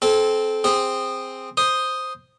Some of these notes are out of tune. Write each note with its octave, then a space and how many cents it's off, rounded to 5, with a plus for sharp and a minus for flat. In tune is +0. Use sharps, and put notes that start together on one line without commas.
C4 +0 A4 -30
C4 +0 G#4 -20
C5 +0 D#6 +0